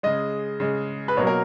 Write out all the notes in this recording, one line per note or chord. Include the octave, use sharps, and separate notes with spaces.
C#3 G#3 D#5
C#3 G#3
B4
B2 F#3 A#3 C#5
A#4